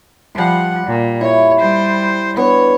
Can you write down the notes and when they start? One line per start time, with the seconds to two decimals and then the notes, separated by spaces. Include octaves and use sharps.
0.35 F3 G3 F#5 C6
0.87 A#2
1.21 E4 C#5
1.59 G3 C5
2.37 B3 D4 C#5